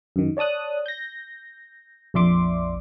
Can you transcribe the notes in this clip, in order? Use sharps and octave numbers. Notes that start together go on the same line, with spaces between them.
F#2 D#3
C#5 D5 A5 D#6 F#6
G6 A#6
A#1 F2 D5 E5 C6 D6